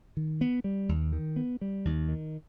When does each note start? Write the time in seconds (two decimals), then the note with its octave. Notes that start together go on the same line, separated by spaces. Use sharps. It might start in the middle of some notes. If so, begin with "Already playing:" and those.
0.17 D#3
0.41 B3
0.64 G3
0.89 D#2
1.13 D#3
1.36 B3
1.61 G3
1.85 D#2
2.08 D#3